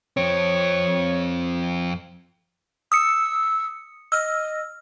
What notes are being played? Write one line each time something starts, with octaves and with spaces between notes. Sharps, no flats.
F2 C4 C#5
D#6 E6 C#7
D#5 E6 F6